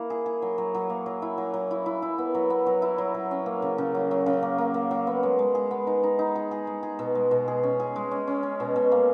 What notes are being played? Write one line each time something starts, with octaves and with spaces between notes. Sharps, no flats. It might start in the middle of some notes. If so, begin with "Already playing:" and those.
Already playing: A#3 E4
G#4
G#4
F#3
F#3
F#3
A#3
F#3
E4
F#3
F#3
E4
E4
E4
B3
F#3
B3
F#3
E4
F#3
F#3
C#4
A#3
C#3
C#3
F#3
F#3
C#3
A#3
A#3
A#3
F#3
B3
G#3
G#3
G#4
B3
D#4
D#4
D#4
G#4
G#4
G#3
G#4
B2
G#3
B2
G#4
C#4
G#4
G#3
C#4
C#4
C#4
B2
B2
A#3